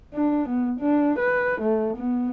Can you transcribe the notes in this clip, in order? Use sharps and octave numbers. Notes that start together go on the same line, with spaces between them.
D4
B3
D4
B4
A3
B3